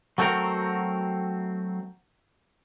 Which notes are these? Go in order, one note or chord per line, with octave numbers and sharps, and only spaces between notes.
F#3 A3 C4 F#4 A#4